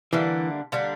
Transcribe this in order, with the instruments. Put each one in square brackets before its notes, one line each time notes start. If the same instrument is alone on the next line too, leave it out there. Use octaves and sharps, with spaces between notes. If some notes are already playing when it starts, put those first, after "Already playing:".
[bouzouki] D3 G3 A#3 D4 [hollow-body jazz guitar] E3
[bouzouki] D3 G3 A#3 D4